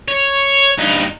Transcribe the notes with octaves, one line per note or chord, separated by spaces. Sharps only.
C#5
G2 D#4